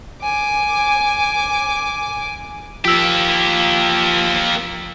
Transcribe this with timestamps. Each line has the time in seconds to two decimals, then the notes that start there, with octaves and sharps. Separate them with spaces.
0.23 G#5 D6
2.85 F3 A#3 G4 E6 B6